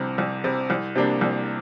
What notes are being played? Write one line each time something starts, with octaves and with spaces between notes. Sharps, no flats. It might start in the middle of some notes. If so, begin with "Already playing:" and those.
Already playing: C2 C3 G3
C2
C3 G3
C2
C3 G3 A#3 D4
C2